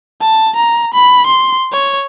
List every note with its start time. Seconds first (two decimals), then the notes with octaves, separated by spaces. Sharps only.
0.21 A5
0.56 A#5
0.94 B5
1.26 C6
1.72 C#5